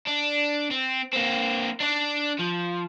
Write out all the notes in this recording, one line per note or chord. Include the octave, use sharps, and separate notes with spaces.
D4
C4
A#3 C4
D4 D5
F3